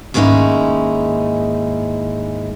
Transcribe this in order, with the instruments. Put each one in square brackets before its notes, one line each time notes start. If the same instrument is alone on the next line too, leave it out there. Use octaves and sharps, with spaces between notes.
[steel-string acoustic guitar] D#2 G#2 G#3 C#4 D#4 E4